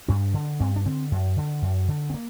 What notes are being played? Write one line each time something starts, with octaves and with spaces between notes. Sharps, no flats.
G2 D4
D3
G2 C4
D4
D3 C4
F#2
D3
F#2
D3
C4
A#3